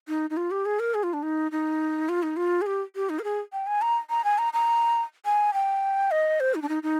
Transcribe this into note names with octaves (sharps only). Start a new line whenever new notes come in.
D#4
D#4
F4
G4
G#4
A#4
G#4
F4
D4
D#4
D#4
F4
D#4
F4
G#4
G4
G4
D#4
A#4
G#4
G5
G#5
A#5
A#5
G#5
A#5
A#5
G#5
G5
D#5
C5
D#4
D4
D#4
D#4